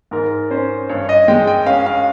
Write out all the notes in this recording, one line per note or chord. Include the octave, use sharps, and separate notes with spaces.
G#2 A#4
C#4 C5
G2 C#5
D#5
G#3 G5
G5
C#4 F5
F5